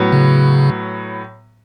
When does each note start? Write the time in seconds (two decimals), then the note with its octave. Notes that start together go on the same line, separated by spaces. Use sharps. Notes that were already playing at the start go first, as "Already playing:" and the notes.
Already playing: A2 F#3 B3
0.12 C#3